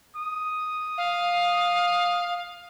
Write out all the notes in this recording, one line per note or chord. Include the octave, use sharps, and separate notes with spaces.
D#6
F5